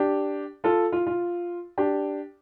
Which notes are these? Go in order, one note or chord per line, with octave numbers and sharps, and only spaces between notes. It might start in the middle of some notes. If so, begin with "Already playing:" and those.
Already playing: D4 G4
F4 A4
F4
F4
D4 G4